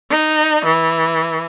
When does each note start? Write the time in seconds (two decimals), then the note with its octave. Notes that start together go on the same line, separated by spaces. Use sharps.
0.10 D#4
0.65 E3